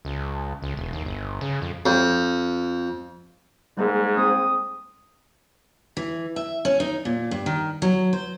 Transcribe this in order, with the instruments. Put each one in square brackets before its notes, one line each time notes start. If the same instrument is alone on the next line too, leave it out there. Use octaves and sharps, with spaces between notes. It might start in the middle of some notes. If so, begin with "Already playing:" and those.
[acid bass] C#2
C#2
E1
D#2
G1
C#3
F2
[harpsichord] F2
[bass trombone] G#2 [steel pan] G3 G#3 A#3
[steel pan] C4 [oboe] D#6
[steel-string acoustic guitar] E3
E5
C#4
D#4
A#2
G2
D#3
F#3
C5